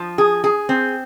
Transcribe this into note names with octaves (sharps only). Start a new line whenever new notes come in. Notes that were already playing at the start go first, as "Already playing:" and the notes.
Already playing: F3
G#4
G#4
C4